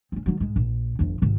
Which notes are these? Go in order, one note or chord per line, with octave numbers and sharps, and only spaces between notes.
C4 C#4
D#3 F#3
G#2 G#3
A#1
G1 F2
G#1 C3